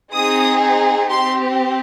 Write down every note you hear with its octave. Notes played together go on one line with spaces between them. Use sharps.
C4 D#4 G#4 D#6
C4 G4 C6